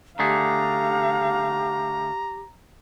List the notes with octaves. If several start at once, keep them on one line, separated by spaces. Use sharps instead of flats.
D3 A3 G4 G#4 F5 A#5